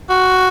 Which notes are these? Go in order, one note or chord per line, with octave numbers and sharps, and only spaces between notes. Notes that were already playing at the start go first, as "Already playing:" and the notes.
F#4